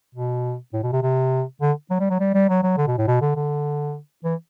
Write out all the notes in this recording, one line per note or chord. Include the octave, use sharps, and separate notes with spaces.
B2
A2
B2
C3
C3
D3
F#3
G3
F#3
G3
G3
F#3
F#3
D3
B2
A2
B2
D3
D3
E3